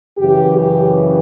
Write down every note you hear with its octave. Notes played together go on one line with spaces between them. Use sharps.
F#2 C#3 E3 G4
G4